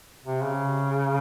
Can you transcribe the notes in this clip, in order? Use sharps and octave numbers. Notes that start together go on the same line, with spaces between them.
C3
C#3